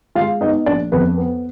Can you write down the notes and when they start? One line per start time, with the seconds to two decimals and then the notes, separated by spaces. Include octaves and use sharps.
0.15 G#3 F4 F5
0.41 B3 D#4 D#5
0.66 A#1 D4 D5
0.92 F2 B3 B4
1.17 B3